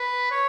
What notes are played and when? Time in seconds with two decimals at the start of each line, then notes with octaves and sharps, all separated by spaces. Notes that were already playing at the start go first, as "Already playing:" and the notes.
Already playing: B4
0.31 C#5